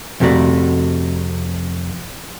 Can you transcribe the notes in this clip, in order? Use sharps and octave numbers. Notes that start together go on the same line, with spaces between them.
F2 C3 A3 D#4 F#4 D5